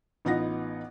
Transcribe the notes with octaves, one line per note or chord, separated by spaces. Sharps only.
A1 B3 D#4 F4 F#5 A#6